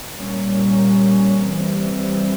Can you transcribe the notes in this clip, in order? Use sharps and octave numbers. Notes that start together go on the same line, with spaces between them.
A#2 G3 A#3 C#4
E3 G3 C4